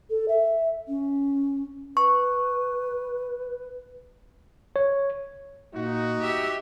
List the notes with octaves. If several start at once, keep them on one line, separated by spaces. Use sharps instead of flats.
A4
E5
C#4
B4 C#6
C#5
A#2 D#4 F#4
G4 E5